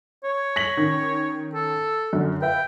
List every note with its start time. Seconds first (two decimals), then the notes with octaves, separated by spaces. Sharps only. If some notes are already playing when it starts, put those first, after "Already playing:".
0.24 C#5
0.56 A#6 B6 F#7
0.77 D#3 C#4
1.55 A4
2.13 F#2 D3
2.42 B4 E5 F5 G5